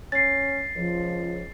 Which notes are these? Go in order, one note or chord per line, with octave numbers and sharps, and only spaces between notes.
C#4 A6 C7
C#2 F3